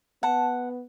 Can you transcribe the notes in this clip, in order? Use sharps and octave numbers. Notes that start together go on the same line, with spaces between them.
B3 F#5 A5